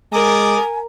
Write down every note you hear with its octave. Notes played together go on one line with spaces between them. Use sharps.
G#3 A#4 D5 G#5 D6 D#6